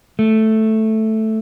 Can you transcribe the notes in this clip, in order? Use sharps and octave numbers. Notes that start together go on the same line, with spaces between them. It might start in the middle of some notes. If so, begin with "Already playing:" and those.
A3